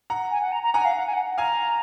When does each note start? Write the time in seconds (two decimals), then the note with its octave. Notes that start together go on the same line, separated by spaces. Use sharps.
0.10 F#5 A#5
0.31 G#5
0.42 F#5
0.52 A#5
0.63 A#5
0.74 F#5 G#5 A#5
0.85 F5
0.96 F#5
1.07 G#5
1.14 F#5
1.31 F#5
1.38 F5 G#5 A#5